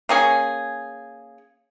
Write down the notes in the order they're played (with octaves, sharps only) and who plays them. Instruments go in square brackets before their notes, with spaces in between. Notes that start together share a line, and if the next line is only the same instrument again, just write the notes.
[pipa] A#3 C#4 G#4